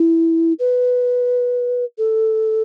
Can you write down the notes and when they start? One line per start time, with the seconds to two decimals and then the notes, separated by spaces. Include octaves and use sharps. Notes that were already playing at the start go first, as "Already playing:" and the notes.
Already playing: E4
0.59 B4
1.98 A4